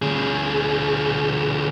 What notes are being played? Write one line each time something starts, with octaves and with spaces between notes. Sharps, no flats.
D2 G#4